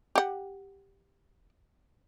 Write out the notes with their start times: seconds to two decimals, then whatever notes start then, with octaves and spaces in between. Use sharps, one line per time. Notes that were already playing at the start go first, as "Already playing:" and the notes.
0.15 G4 F#5